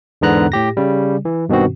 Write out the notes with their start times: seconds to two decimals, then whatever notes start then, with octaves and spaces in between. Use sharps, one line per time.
0.21 E2 G#2 D3 B3 A#5 F#6
0.52 A2 G4 A#6
0.77 C#3 G3
1.25 E3
1.49 G2 B2 D#3 C4 F#4